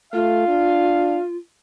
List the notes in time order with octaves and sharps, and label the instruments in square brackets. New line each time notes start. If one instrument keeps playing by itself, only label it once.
[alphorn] A3 [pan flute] F4 [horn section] F5
[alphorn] D4